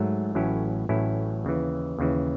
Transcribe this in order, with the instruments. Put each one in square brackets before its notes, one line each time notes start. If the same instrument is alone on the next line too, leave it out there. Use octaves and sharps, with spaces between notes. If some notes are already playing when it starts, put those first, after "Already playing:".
Already playing: [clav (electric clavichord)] G#2 F#3 A3
A1 A2 F#3 C#4 E4
A1 A2 F#3 C#4 E4
D#2 C#3 E3
D#2 C#3 E3